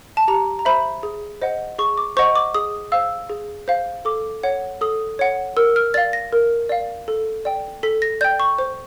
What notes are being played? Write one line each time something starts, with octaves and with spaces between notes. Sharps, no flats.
A5
G4 A#5
A#5
C5 E5 B5
G#4
C5 D#5 F#5
G#4 C#6
D6
C5 D#5 F#5 C#6
D6
G#4 D#6
C5 F5 E6
G#4
C5 F5
A4 D6
C#5 F#5
A4 D#6
C#5 F#5
A#4 E6
F6
D5 F5 A6
A#6
A#4
D5 F5
A4
D5 G5
A4 B6
A#6
D5 G5 G6
C#6
C5